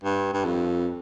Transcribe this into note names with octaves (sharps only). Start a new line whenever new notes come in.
G2
G2
F2